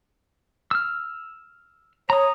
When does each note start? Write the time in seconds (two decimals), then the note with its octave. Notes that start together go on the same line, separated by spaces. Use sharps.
0.71 E6 F6
2.10 C#5 A#5 D#6